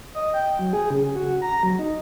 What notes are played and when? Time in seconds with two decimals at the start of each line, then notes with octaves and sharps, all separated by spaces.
0.15 D#5
0.34 G5
0.59 F#3
0.73 G#4
0.90 C#3
1.15 F#4
1.42 A#5
1.63 F#3
1.79 D#4